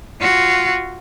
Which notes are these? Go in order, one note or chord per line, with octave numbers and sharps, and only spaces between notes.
F4 F#4